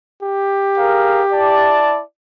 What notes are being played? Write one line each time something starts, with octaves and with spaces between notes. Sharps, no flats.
G4
G#4 A#4 F5
E4 D5 A5